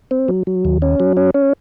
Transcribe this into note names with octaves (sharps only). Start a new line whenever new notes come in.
C4
F#3
F#3
D#2
C#4
F#3
C#4
C#4